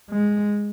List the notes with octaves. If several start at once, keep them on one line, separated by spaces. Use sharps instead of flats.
G#3